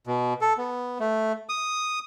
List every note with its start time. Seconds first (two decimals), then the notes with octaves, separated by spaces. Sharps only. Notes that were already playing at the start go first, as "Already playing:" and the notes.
0.07 B2
0.41 A4
0.58 B3
1.00 A3
1.49 D#6